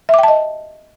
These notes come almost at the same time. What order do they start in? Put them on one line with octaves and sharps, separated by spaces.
E5 D6 G5 A5 D#5